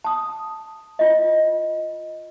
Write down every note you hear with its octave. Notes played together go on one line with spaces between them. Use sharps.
A5 D#6
F4 D#5